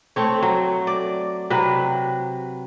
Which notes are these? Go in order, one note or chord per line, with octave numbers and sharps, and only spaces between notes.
A3 C4 C#5
F#3
D5
C3 F#3 B4